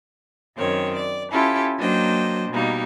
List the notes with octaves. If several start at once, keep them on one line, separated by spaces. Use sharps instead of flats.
F#2 D#3 C4 C#5
D5
C#4 E4 F4 G4 A4
F#3 A#3 D4 C5 D#5 G5
B2 G3 A#3 D#4